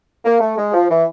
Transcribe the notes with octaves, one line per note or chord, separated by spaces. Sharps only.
A#3
A3
G#3
F3
E3